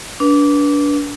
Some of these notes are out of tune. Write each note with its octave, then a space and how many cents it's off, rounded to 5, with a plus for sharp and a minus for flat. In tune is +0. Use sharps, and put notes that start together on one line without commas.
D4 -20 B4 -25